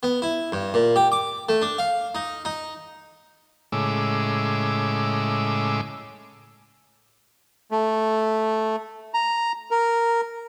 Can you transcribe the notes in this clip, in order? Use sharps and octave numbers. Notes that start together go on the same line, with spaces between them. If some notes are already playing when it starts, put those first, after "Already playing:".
B3
E4
G2
A#2
G4
D6
A3
D4
F5
D#4
D#4
A2 C#3 G#3 D6 E6
A3
A#5
A#4